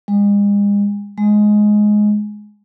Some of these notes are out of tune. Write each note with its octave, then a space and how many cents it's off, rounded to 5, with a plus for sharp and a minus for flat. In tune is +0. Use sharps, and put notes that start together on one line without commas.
G#3 -40
G#3 +10